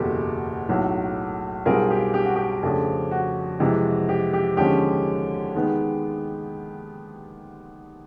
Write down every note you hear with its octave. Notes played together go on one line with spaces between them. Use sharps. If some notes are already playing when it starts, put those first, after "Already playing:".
Already playing: F#1 E2 B2 G4 A4
B1 A2 F#3
B1 B2 G3 C4 F4 G#4 A#4
G4
G4
F#4
G4
F2 C#3 F3 A3 D4
F#4
F2 C3 E3 G#3
G4
G4
D#2 D3 F3 G#3 C#4 G4
D#3 G#3 B3